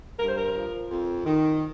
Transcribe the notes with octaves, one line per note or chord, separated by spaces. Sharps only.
G2 A#4
C5
A#4
F3
F2
D#3